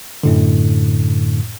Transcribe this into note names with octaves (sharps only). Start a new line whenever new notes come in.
F#2 A2 D3